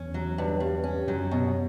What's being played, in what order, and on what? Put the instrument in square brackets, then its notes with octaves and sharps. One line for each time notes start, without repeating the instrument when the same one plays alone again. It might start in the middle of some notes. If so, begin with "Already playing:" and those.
Already playing: [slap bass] E2 [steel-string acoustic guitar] C#4
[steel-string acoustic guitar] F#3
G2
G2
C#4
[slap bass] F#2 [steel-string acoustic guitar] F#3
[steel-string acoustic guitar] B2